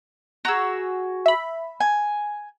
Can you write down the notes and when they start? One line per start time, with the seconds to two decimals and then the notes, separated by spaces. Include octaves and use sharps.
0.45 F#4 G#4 A#5 E6
1.26 E5 B5
1.80 G#5